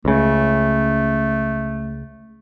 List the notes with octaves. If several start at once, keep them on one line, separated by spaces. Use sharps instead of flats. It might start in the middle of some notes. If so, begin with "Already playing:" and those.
C#2 C#3 A3